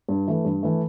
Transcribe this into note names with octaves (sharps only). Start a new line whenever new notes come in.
G2
E3 A3
G2
E3 A3